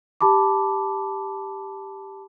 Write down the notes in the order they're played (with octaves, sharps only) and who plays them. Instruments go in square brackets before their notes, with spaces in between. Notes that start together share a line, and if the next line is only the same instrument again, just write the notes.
[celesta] G4 A5 B5 D6